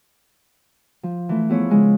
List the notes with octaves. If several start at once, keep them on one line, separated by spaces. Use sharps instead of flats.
F3
E3 A3
F3 B3 E4 G#4 C#5
C#3 G#3 F4